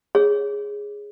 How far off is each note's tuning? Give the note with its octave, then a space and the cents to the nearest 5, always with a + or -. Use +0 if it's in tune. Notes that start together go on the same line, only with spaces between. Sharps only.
G#4 -10 C#5 +0